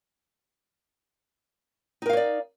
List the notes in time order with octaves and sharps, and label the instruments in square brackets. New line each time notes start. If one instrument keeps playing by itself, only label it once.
[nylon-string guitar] D#4
A#4
F5
C#5
D5